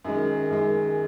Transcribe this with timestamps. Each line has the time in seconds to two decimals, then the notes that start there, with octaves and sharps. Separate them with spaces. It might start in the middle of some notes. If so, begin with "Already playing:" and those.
0.05 F#2 D#3 G#3
0.51 F#2 D#3 G#3